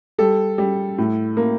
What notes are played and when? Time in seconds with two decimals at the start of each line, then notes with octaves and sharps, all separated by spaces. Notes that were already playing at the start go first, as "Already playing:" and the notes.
0.18 G3 A4
0.58 G3
0.98 A2
1.37 A#3